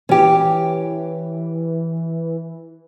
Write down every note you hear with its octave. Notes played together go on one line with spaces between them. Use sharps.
E3 C#4 G4